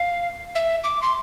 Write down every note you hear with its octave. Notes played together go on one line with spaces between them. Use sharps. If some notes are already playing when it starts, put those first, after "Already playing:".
Already playing: F5
E5
D6
C6